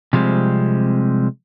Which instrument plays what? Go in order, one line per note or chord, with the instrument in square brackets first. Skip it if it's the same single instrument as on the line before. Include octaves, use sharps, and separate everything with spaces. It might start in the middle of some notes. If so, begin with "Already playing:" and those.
[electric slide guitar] C3 F3 G3 G#3 C4